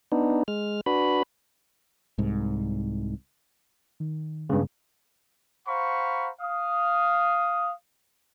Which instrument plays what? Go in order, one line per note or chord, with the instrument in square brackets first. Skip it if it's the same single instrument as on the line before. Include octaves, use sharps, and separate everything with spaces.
[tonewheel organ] B3 D4 D#4
G#3 F6
D4 F#4 B4 B5
[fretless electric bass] C2 G#2
[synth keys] D#3
[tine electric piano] G2 C#3 [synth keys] G#3 B3 B4
[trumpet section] C5 F5 F#5 A#5 B5 C#6
F5 D#6